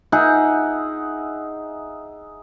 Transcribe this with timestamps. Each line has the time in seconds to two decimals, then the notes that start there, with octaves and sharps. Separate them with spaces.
0.12 D#4 G#4 E5 F#5